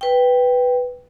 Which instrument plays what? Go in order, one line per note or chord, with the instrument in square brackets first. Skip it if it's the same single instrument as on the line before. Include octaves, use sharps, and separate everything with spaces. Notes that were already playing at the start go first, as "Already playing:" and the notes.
[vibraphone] B4 G5